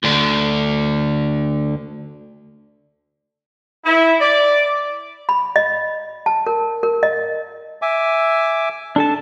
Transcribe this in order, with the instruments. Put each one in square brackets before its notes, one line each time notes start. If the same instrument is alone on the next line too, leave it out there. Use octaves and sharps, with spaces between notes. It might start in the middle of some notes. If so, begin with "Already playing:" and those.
[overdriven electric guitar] D2 D3
[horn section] E4
D5
[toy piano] B5
D#5
A5
A#4
A#4
D#5
[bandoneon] E5 G#5 D6
[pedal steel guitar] D4 A4 A5